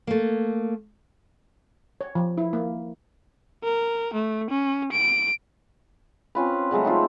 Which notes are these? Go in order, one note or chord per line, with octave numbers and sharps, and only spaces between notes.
A3 A#3
C#5
F3
E4
A#3
A#4
A3
C#4
D7
C4 C#4 F4 B4
C#3 F#3 G#3 A3
C4 D#4 F4 A4